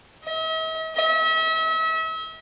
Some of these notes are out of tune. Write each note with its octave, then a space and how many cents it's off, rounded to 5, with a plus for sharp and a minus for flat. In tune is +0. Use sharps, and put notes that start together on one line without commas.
E5 -45
E5 -40